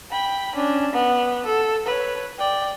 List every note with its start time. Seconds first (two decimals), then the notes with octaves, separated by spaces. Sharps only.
0.11 G5 B5
0.55 C#4 D4
0.93 B3
1.46 A4
1.86 B4 C#5
2.38 D5 G5